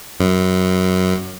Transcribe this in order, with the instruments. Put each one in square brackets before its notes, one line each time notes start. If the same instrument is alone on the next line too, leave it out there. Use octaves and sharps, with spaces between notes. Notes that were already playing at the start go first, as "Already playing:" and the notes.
[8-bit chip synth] F#2